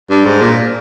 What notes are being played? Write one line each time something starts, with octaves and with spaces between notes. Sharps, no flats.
G2
G#2
A#2